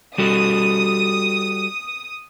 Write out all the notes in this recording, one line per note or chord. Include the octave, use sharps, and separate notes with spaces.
G3 F#4 A4 D#6